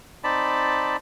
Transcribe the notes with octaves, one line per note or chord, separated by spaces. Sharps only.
C4 D#4 D5 A5 B5